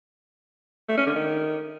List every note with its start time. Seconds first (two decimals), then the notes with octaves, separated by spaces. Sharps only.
0.88 A3
0.97 C#4
1.06 D3
1.15 D#3